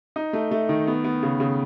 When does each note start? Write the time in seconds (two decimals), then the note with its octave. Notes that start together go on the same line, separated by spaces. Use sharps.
0.16 D#4
0.33 A3
0.51 A3
0.69 D#3
0.87 B3
1.04 B3
1.23 C#3
1.40 C#3